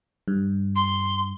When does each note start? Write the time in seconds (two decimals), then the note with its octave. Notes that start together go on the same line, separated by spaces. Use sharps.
0.28 G2
0.75 C6